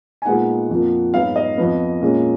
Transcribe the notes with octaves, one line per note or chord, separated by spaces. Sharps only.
G#5
A#2 G#3 B3 D#4 F#5
F2 F3 A#3
G#2 F#3 B3 F5
D#5
F2 F3 B3
A#2 G#3 C#4